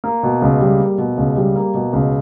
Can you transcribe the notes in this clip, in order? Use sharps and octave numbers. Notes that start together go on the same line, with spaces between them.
A#3
B2
C#2
G3
A#3
B2
C#2
G3
A#3
B2
C#2